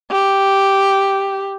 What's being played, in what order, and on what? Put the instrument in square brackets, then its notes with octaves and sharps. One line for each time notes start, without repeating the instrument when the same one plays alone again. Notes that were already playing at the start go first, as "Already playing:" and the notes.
[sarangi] G4